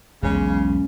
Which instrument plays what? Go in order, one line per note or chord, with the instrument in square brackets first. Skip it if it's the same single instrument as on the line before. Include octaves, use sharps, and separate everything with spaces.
[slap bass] E1 B1 [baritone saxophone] C#3 [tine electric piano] G#3 C#4